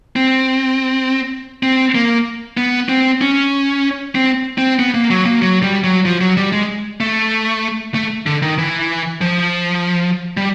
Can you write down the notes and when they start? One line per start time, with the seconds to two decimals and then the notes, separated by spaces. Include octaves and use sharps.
0.16 C4
1.63 C4
1.95 A#3
2.57 B3
2.89 C4
3.21 C#4
4.15 C4
4.58 C4
4.79 B3
4.94 A#3
5.10 F#3
5.26 A#3
5.42 F#3
5.63 G3
5.84 F#3
6.05 F3
6.21 F#3
6.37 G3
6.52 G#3
7.00 A3
7.94 A3
8.26 D3
8.42 D#3
8.58 E3
9.21 F3
10.37 G3